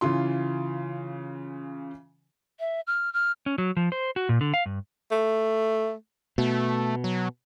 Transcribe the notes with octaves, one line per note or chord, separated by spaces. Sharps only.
C#3 E3 F4 C6
E5
F6
F6
C#4
F#3
F3
C5
F#4
A#2
D3
F5
G2
A3
B2 A3
F#3